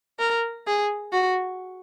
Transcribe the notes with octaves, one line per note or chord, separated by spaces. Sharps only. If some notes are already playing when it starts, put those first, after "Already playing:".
A#4
G#4
F#4